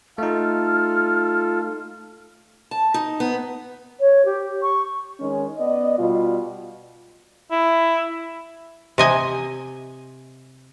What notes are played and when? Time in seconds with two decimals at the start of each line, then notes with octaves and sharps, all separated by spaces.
0.18 A3 D#4 F4 A4 F6
2.71 A5
2.94 D#4
3.20 B3
4.00 C#5
4.25 G4
4.62 C#6
5.20 D#3 G#3 C#4
5.58 B3 D5 D#5
5.98 B2 G3 F4
7.52 E4
8.98 C3 D#5 G#5